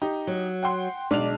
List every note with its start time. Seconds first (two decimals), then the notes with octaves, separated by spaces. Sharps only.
0.02 D#4 G4
0.27 F#3
0.63 F#5 G5 C6
1.11 B1 G#3 D4 D#4 D5 F7